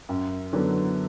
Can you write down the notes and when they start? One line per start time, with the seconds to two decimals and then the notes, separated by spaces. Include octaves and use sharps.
0.09 F#2
0.53 D3 F#3 B3